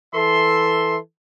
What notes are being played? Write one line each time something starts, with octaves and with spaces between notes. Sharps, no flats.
E3 A4 E5 C6